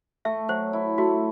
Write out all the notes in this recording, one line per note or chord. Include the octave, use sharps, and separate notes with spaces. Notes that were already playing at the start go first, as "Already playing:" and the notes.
A3 E5
F#3 C5
E4
A3 F#4